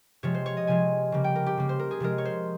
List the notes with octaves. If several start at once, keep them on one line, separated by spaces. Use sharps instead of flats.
C3 F3 G#3 C#5
C5
C#5
D#5
C3 F3 G#3 G#5
C#3 G3 A#3
G5
A#4
G4
C#3 G3 A#3
C5
A#4
G#4
C3 F3 G#3 A#4
C#5
C5